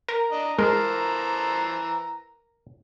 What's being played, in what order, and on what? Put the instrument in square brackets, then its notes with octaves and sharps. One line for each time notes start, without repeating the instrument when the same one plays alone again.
[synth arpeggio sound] A#4 [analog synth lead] A#5
[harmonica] D4 D#5
[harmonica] E3 C5 A5 [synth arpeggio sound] G#3 [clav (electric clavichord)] A#4